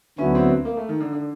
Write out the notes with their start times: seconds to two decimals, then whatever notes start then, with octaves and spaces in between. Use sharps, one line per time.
0.18 D2 D3 F#3 B3 C#4 E4
0.35 C4
0.65 A#3
0.77 A3
0.89 D#3
1.00 D3
1.13 D3